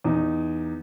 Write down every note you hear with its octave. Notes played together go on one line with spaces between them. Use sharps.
E2 D#4